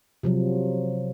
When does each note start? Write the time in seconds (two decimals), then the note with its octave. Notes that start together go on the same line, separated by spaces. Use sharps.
0.23 C3 F3 F#3